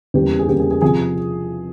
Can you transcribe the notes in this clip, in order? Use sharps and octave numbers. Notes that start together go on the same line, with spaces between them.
E2 C#3 G3 A#3 G4
G#4
E2 C#3 G3 A#3 G4
G#4
G#4
C3 F3 G#4